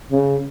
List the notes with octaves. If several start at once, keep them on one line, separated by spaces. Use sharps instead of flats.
C#3